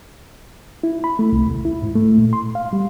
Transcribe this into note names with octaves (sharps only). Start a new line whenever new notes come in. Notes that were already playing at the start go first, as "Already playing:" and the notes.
E4
B5
A3
C2
D#2
E4
G#2
A3
A#2
C6
F5
G3